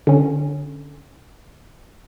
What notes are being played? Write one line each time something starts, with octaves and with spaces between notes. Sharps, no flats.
D3 C#4